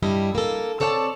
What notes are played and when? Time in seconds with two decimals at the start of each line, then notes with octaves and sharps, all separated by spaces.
0.03 G2 G3 E4 D#5
0.35 A#3 A4
0.80 C4 A4 C#5 D5 F#5 A5